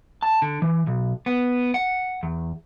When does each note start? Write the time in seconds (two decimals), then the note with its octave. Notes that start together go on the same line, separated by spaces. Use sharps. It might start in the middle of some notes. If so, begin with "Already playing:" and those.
0.23 A5
0.42 D3
0.62 E3
0.87 B1
1.26 B3
1.74 F#5
2.23 E2